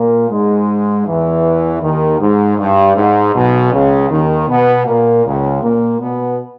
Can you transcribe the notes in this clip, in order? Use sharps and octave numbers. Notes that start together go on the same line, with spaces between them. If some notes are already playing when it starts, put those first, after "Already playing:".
Already playing: A#2 A#3
G#2 G#3
E2 E3
D#2 D#3
G#2
G2
G#2
B1 B2
C#2 C#3
D#2 D#3
B2 B3
A#2 A#3
C#2 C#3
A#2 A#3
B2 B3